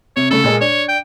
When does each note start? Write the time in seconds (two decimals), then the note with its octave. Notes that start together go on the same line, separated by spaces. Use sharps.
0.17 C3 C#5
0.31 C#3 A3 A4
0.44 A#2 G#3 A#3
0.61 D4 C#5
0.89 G5